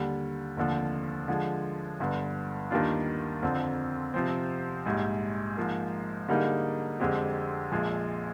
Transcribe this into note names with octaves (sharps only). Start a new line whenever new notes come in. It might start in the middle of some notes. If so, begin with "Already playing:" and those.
Already playing: D#2 D3 G3
F1 D#2 D3 F3
D3 F3 G#3
G1 G2 D3
D#2 D#3 G3 D4 F4
F2 D3 F3 C4
C3 F3 C4
A#1 G#2 G3
G#2 F3 A#3
D3 G3 A#3 D#4 G#4
F2 D3 G#3 C4 G4
A#1 A#2 F3 G#3